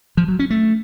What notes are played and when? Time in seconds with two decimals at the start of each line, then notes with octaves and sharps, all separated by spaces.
0.17 F3
0.28 F#3
0.39 C#4
0.50 A3